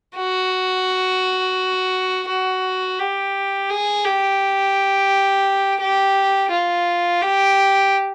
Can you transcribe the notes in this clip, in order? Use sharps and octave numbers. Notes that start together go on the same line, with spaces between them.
F#4
F#4
G4
G#4
G4
G4
F4
G4